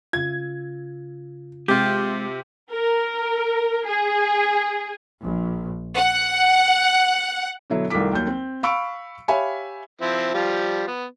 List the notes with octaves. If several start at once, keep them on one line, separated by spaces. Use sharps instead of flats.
C#3 F4 G#6
C3 G#3 F4 G4
A#4
G#4
A#1
F#5
B2 D3 F#3 E4
C2 D#3 A3 F4 D6 B6
D#2 F#3 G6
C4
F5 B5 C#6 E6 D7
G4 C#5 E5 F5 G#5 B5
F3 C4 E4
F3 G3 F4
B3